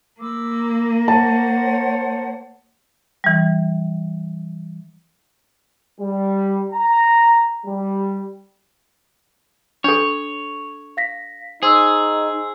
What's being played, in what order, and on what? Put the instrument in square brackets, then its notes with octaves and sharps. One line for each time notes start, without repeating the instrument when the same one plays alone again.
[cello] A#3 [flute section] B5 D6 E6
[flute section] C5 C#5 F#5 [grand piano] A5
[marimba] E3 G3
[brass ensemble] G3
A#5
G3
[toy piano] D4 A4 [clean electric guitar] C#5
[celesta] F5 A#6 B6
[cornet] D#4 [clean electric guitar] G#4 [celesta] C5 C6 E6